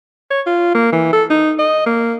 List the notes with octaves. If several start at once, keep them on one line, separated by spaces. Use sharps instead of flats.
C#5
F4
A#3
E3
A4
D#4
D#5
A#3